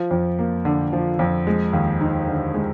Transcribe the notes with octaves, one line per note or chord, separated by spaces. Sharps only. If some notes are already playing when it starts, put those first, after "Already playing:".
Already playing: F3
F2
A#3
D3
F3
F2
G#3
D#2
D#4
D3
G#3